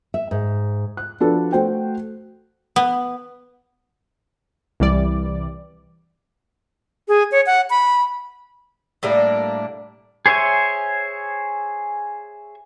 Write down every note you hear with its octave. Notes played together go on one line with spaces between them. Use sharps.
E5
G#2
F#6
F3 D4 F#4 A4 B4
A3 F#4 C5 G5
B3
C2 E3 G3 D5
G#4
C#5
F#5
B5
A2 G3 A#3 D4
G#4 C5 C#5 E5 G#5